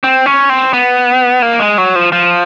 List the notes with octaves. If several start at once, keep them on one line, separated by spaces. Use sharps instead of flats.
C4
C#4
C4
B3
A#3
G#3
F#3
F3
F3